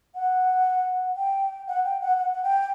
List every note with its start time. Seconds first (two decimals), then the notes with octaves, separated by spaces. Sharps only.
0.15 F#5
1.16 G5
1.67 F#5
1.84 G5
2.00 F#5
2.18 F#5
2.33 F#5
2.43 G5